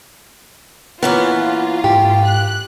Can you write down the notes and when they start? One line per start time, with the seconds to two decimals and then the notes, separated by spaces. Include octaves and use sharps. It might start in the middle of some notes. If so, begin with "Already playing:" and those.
1.03 E3 A#3 B3 C#4 F4
1.84 G#2 G4
2.25 F#6